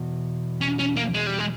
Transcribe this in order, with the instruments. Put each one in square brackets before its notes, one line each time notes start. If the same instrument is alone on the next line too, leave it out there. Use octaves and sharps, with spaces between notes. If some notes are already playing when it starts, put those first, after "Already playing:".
Already playing: [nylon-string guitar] E2 B2
[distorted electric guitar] C#4
C#4
A#3
G#3
G3
G#3